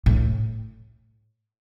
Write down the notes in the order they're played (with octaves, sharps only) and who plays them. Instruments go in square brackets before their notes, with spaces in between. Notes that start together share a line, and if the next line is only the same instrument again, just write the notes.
[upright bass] A2